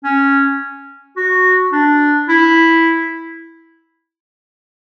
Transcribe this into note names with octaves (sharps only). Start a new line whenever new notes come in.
C#4
F#4
D4
E4